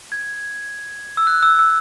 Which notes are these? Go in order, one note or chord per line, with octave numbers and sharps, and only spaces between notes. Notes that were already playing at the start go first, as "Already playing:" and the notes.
G#6
E6
F#6
E6
E6